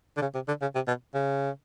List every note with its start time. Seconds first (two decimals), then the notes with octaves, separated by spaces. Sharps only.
0.17 D3
0.21 C#3
0.34 C3
0.48 D3
0.61 C#3
0.75 C3
0.87 B2
1.14 C#3